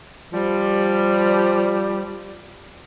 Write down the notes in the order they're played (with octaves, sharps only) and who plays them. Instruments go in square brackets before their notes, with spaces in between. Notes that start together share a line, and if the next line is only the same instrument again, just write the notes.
[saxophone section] F3 G3